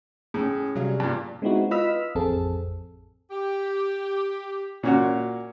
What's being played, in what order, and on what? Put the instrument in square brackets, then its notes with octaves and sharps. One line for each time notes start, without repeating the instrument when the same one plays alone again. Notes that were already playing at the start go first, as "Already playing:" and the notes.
[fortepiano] A2 [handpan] C#4 G#4
[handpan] C3 G3 F5 [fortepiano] F#3
[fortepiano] G2 A#2
[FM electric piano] G#3 B3 C4 D#4 E4 F#4
F4 B4 D#5 E6 F6 B6
A1 F2 C4 G#4 A4
[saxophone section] G4
[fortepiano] A#2 C#4 F#4